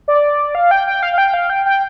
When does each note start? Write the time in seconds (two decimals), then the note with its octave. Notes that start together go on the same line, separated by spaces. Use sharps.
0.08 D5
0.55 F5
0.71 G5
0.87 G5
1.03 F5
1.13 F5
1.18 G5
1.34 F5
1.50 G5
1.66 G5